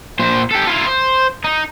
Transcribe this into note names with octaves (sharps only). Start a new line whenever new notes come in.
A#2 C5
G4 A4
E4 F4
C5
D#4